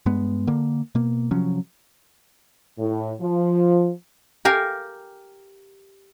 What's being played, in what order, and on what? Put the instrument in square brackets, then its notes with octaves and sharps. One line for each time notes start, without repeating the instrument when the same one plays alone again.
[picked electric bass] G2 G#3 B3
D3 A#3
B2 A#3
C3 F3 F#3 C#4
[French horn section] A2
F3
[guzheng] G4 A#4 F5 G#5